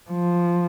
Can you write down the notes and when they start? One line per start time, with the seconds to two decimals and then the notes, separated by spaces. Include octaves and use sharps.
0.11 F3